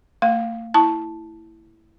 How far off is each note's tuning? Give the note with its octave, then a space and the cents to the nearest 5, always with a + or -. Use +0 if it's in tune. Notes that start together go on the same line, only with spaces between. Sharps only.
A3 +45 F5 +0
E4 +0 A5 +0